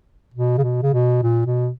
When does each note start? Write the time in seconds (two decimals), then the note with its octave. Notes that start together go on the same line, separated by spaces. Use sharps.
0.34 B2
0.58 C#3
0.63 B2
0.83 C#3
0.93 B2
1.23 A#2
1.46 B2